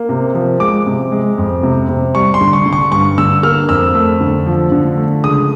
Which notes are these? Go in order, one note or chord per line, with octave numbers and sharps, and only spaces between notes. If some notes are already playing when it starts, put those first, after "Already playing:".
Already playing: A#3
C3
F3
G#3 D6
C3
G#3
F2
C3
C3
G3 C#6
C6
D3
C#6
D3
C#6
G2 C#6
D3 E6
A#3 F6
F2 E6
A3
D3
F3
D3
A3
C#2 D#6